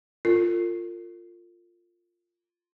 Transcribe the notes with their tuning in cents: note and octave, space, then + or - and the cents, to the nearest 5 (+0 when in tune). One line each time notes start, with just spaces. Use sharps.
F4 +0 A#4 -45